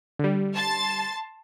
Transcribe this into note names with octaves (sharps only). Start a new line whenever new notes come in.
D3 G3
A5 C6 A6